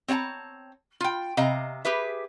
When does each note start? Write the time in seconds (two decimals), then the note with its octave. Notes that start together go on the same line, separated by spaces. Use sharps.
0.08 C4 C#5 F#5 A5 A#5
1.00 F4 G5
1.37 C3 D#5 F5 A#5
1.85 G4 G#4 B4 E5